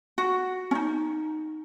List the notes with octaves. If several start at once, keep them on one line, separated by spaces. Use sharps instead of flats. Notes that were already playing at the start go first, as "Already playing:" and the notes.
F#4
C#4 D#4